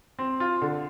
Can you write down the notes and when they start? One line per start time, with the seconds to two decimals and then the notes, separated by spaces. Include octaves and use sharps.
0.19 C4
0.40 F4
0.62 D3